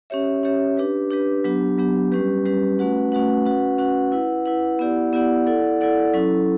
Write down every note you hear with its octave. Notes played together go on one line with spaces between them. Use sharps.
C#4 G4 C#5 E5
C#4 G4 C#5 E5
D4 G4 B4
D4 G4 B4
F#3 B3 D4 G4
F#3 B3 D4 G4
G3 C#4 G4 B4
G3 C#4 G4 B4
A3 C#4 F#4 B4 F#5
A3 C#4 F#4 B4 F#5
C#4 F#4 B4 F#5
C#4 F#4 B4 F#5
E4 B4 F#5
E4 B4 F#5
B3 E4 G4 D5 F#5
B3 E4 G4 D5 F#5
E4 A4 D5 F#5
E4 A4 D5 F#5
F#3 C#4 E4 A4